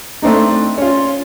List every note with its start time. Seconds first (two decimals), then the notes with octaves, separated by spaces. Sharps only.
0.22 A3 C4 D4 D#4
0.78 C#4 F4